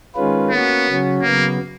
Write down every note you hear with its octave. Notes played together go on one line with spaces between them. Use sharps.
D#3 G#3 C#4 F4 B4
A#3 B3 C#4 F#4
C#3 F#3 C#4 F#4
C#3 F#3 A#3 B3